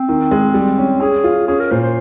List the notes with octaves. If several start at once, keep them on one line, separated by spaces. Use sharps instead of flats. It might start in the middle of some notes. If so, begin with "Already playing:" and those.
Already playing: C4
D#3
G#3
G3
C#4
C#4 G#4
F4
C#4 G#4
A#4
A#2 C5
C5